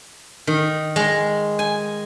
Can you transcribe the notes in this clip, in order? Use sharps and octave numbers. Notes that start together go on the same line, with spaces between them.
D#3
G#3
G#5